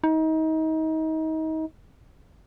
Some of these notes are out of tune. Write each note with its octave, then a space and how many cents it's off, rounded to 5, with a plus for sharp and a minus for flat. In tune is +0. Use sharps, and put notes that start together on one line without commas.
D#4 +30